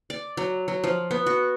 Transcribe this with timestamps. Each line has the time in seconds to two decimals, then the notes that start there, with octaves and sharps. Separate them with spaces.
0.10 D5
0.37 F#3
0.68 F#3
0.84 F3
1.11 B3
1.26 F#4